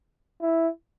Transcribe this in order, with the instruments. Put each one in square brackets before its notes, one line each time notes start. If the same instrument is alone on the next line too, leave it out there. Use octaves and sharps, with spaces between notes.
[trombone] E4